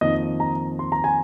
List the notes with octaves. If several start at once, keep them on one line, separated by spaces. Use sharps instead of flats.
F2 D#3 A#3 D#5
A#5
C6
A#5
G#5